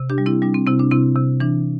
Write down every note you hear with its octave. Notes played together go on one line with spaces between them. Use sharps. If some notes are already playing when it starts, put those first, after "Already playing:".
Already playing: C3
D4 G4
G3
C4 E4
G3 D4
C4
C3 C4 E4
D4
C3 C4 E4
C3
E3 D4